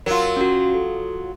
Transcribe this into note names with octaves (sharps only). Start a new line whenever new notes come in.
F#3 F4 A#4
C#4 F#4
A4